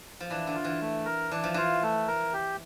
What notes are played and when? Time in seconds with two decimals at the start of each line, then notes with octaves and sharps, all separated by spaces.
0.20 F3
0.30 E3 D4
0.47 D3
0.55 F4
0.64 E3
0.81 A3
1.05 A#4
1.31 E3 D4
1.44 F3
1.54 E3 F4
1.82 A3
2.08 A#4
2.33 G4